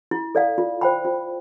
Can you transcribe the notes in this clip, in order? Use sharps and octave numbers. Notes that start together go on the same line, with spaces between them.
E4
A4 D5 F5
F4
C5 G5 B5
F4